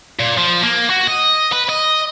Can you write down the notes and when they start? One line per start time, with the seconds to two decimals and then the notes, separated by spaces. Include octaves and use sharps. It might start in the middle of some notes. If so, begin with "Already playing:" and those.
0.20 A#2
0.38 F3
0.63 A#3
0.90 F#4
1.07 D#5
1.52 B4
1.70 D#5